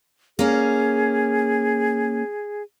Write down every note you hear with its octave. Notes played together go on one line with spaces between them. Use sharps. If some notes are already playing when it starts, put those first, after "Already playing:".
A#3 C#4 G#4